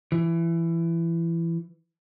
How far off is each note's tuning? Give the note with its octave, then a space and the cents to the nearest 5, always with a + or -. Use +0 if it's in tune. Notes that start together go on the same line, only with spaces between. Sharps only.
E3 +20